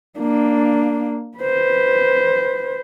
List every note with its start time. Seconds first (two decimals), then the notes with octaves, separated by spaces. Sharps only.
0.19 A#3 D4
1.38 B4 C5